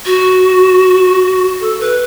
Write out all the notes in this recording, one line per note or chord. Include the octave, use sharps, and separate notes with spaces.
F#4
A4
B4